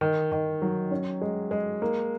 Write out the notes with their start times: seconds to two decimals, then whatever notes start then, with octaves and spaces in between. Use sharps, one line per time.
0.01 D#3
0.32 D#3
0.62 F#3
0.91 C#4
1.22 G#3
1.51 G#3
1.82 A#3